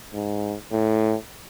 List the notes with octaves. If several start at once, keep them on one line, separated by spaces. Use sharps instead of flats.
G#2
A2